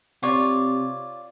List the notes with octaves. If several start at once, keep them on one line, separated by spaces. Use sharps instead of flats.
C3 F4 C#5 D5